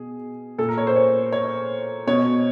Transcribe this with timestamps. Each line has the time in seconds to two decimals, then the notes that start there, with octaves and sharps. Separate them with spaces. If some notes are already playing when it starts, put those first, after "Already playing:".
Already playing: B2 G#4
0.58 A#2 A4
0.69 A#4
0.78 C#5
0.87 C5
0.96 C#5
1.32 C#5
2.07 B2 C#5